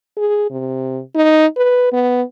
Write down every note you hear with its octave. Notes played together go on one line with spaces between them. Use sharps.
G#4
C3
D#4
B4
B3